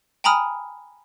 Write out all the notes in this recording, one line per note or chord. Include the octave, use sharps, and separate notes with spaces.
G5 G#5 A#5 B5 D#6 F6